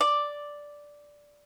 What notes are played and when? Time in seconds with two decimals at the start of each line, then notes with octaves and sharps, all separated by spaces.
0.01 D5